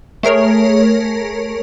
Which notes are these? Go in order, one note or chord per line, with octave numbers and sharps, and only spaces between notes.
A3 G#4 A#4 C#5